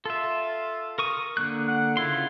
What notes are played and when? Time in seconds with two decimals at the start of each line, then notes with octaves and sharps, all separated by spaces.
0.05 F4 A4 E5
0.98 A#4 C#6 D#6
1.37 D3 A#3 F#6
1.67 F#5
1.97 C#3 E4 F4 C6